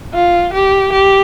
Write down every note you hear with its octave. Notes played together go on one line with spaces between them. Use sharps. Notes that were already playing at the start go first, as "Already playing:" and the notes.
F4
G4
G4